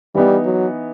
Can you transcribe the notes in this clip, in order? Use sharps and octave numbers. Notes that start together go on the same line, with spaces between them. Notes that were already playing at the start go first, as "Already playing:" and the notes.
E3 G3 B3 D#4
F#3